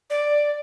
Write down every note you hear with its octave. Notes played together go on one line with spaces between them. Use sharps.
D5